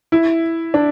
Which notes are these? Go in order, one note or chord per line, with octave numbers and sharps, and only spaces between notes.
E4
D4